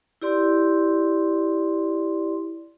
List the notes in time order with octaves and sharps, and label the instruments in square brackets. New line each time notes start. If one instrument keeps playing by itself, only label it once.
[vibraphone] E4 G4 D5 C6